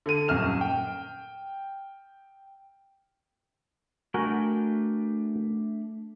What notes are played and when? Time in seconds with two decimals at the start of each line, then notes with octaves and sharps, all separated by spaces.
0.06 D3 D#7
0.28 D#1 F#2 F6 E7
0.61 G5
4.14 A3 D4 F#4 A#4 G5 G#5